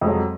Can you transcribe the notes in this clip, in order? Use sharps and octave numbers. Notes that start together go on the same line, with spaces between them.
F2 F#3 G#3